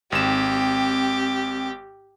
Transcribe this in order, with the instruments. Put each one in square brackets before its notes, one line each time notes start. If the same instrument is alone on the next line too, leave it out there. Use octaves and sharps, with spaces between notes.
[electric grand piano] G#1 E7 [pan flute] C4 [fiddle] G4